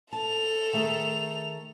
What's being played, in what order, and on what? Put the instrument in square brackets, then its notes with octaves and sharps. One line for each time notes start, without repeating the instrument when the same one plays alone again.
[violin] A4 F7 [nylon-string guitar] A5
[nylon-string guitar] D#3 A3 G#4